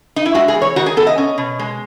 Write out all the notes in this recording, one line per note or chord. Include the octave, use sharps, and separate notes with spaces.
D#4
E4
G#3 F#4
G#4
E2
C#5
D#3 F#4
G#4
B3 A4
D#5
C#4
B2
G#3